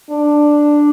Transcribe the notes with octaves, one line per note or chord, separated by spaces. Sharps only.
D4